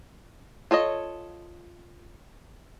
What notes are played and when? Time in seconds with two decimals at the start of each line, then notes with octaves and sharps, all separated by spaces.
0.71 F4 A4 C#5 D#5